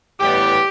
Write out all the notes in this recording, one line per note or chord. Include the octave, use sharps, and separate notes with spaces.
A2 E3 G3 B3 G4